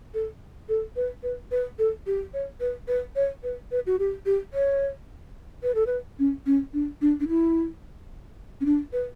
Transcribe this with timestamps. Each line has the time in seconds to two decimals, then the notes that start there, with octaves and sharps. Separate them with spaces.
0.14 A4
0.69 A4
0.96 B4
1.23 B4
1.51 B4
1.79 A4
2.07 G4
2.34 C#5
2.60 B4
2.88 B4
3.16 C#5
3.43 B4
3.71 B4
3.87 F#4
3.99 G4
4.26 G4
4.54 C#5
5.63 B4
5.75 A4
5.86 B4
6.19 C#4
6.46 C#4
6.73 D4
7.01 D4
7.20 D4
7.28 E4
8.61 C#4
8.66 D4
8.93 B4